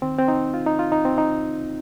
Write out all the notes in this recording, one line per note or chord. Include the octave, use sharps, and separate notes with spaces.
D#2 D#3 C4
C4
D#4
F4
D#4
F4
D#4
C4
D#4